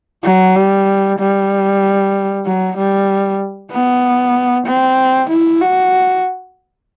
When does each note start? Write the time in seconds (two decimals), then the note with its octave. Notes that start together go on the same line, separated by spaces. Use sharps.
0.24 F#3
0.55 G3
1.19 G3
2.46 F#3
2.77 G3
3.72 B3
4.67 C4
5.29 E4
5.61 F#4